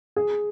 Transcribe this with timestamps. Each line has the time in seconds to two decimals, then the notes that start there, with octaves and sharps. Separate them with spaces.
0.16 G#4